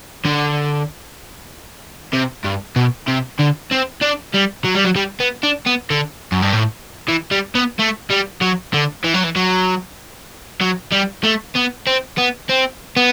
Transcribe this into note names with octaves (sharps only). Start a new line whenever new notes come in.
D3
C3
G2
B2
C3
D3
C4
D4
G3
F#3
G3
F#3
G3
B3
D4
B3
D3
F#2
G2
A2
E3
G3
B3
A3
G3
F#3
D3
E3
F#3
E3
F#3
F#3
G3
A3
B3
C4
B3
C4
B3